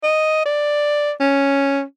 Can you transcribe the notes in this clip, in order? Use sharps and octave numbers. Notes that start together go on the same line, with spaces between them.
D#5
D5
C#4